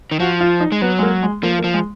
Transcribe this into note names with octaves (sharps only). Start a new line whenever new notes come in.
D#3
F3 F#4
F4
D#4
G#3
F#3 B3
G#3
A#3
G#3
F3 A#3
A#3
F3
G#3